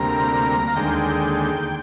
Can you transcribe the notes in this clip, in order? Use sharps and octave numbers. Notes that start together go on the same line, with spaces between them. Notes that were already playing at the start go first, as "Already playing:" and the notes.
Already playing: D2 C3 G3 A#3 A#5
F5
D#2 D3 G#3 G5